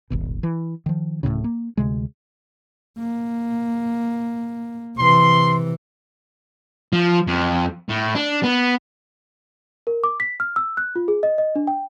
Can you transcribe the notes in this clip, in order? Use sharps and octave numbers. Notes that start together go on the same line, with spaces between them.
D#1 G#1 B2
E3
D#3 F3
D1 G1 A2 C#3
A#3
D2 C3 G#3
A#3
C3 E3 C6
F3
F2
A2
D4
B3
A#4
D6
B6
F6
E6
F#6
F4
G#4
D#5
D#5
D4
G5